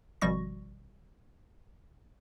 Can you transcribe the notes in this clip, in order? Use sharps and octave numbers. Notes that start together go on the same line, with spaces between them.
G#1 B2 F3 G3 C#6 A#6